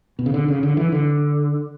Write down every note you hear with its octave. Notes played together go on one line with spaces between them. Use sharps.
B2
C#3
D3
C#3
D3
E3
D3